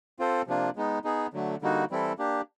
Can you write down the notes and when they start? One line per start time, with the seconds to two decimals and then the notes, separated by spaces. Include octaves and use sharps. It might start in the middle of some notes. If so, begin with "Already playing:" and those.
0.19 C4 F4 A4 C5
0.47 C3 F3 A#3 D4 F4
0.76 G#3 B3 D#4
1.04 B3 D#4 G#4
1.33 D3 F#3 A3
1.62 D3 G3 A#3 D#4 F#4
1.90 E3 G3 C4 E4 A4
2.18 A#3 D4 G4